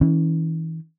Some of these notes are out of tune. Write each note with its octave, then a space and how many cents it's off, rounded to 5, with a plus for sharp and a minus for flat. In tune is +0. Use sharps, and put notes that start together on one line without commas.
E3 -35 C#4 +0